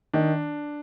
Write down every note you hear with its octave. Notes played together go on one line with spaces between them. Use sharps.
D#3 D4